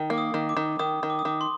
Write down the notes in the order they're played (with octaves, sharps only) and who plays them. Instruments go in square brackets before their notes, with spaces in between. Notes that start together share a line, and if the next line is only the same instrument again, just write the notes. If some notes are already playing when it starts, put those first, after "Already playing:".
Already playing: [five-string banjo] D#3
[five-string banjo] A#3 [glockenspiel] D6
[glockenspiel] D#6
[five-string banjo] D#3
[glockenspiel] D6
[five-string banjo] D#3
[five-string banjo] D#3 [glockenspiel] D#6
[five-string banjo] D#3
[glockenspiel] D6
D#6
[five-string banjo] D#3 [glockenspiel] D6
[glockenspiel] C6